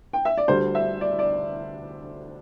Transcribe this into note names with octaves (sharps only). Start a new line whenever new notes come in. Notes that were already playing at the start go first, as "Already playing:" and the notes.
G5
E5
D5
D2 D3 G3 C5
E5
D5
D5